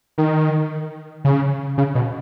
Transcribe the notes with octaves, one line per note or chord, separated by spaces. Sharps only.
D#3
C#3
C#3
B2